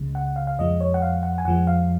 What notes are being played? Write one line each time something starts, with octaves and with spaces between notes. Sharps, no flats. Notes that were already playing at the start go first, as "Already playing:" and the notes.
Already playing: C#2 C#3 G#3
F#5
F5
F5
F2 F3 G#3 D#5
C#5
F#5
F5
F#5
G#5
F2 F3 G#3 F#5
F5